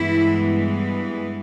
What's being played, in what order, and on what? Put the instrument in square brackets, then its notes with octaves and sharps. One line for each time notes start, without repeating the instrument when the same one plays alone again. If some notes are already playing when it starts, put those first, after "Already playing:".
Already playing: [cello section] G2 E3 G#3 B3 E4